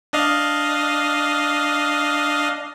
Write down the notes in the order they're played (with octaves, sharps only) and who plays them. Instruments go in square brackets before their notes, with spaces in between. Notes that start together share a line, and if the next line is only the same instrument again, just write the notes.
[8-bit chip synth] D4 D#5 F5